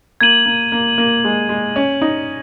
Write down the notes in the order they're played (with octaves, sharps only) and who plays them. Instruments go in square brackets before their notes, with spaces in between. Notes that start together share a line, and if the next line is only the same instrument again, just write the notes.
[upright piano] A#3 [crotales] G#6 D#7 F#7
[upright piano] A#3
A#3
A#3
G#3
G#3
C#4
D#4